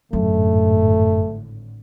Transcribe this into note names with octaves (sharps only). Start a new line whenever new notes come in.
G#1 F#2 A2 D3 A3